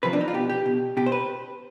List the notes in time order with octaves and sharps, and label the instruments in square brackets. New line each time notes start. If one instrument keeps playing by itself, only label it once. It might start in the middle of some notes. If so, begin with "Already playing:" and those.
[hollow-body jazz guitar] C3 F3 B4
D4
D#4
F4
B2 G4
G4
B2
B2 G4
C5
B4